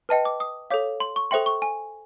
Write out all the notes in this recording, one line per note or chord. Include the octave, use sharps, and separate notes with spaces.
B4 D#5 G5 A5
D6
D#6
A4 C#5 F5 D6
C6
C#6
A4 C5 E5 G5 C6
C#6
G#5